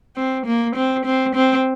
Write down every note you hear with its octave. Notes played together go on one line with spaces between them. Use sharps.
C4
A#3
C4
C4
C4